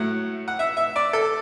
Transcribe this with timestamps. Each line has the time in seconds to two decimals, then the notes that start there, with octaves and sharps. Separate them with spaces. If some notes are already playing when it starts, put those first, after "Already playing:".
Already playing: A2 F#3 A3 F#5
0.48 F#5
0.59 E5
0.77 E5
0.96 D5
1.13 A4